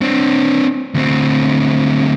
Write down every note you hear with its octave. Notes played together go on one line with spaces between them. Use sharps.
C4 D4
D2 C4